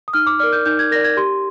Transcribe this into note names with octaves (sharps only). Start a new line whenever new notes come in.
D#6
D#4 F6
D6
A#4 D5 F6
G6
D#4 G6
G#6
A#4 D5 A#6
G#6
G4 C6